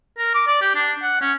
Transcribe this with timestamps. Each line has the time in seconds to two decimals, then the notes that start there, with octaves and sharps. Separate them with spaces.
0.18 A#4
0.34 D6
0.47 D5
0.61 G4
0.75 D4
1.02 F#5
1.21 C#4